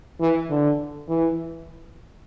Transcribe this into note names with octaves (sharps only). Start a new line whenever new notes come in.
E3
D3
E3